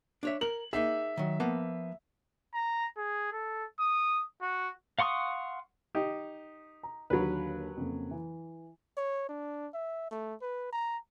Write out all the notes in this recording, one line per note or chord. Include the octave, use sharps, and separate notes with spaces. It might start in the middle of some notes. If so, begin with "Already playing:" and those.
D4 C#5 E5
A#4 F#7
A#3 D#4 G#4 E5
D#3 F#3
F3 A#3 B3
A#5
G#4
A4
D#6
F#4
F5 F#5 C6 C#6 D#6
D#4 G4
A#5
D#2 D3 F#3 B4
F2 C#3 A#3
E3
C#5
D4
E5
A3
B4
A#5